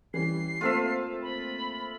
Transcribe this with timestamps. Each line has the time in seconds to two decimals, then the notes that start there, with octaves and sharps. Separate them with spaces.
0.14 E3 G3 C#4 C7
0.61 A3 A#3 C4 F4 A4 E5
1.22 B5